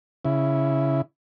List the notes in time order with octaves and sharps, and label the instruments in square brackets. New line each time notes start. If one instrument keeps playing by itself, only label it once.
[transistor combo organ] C#3 E4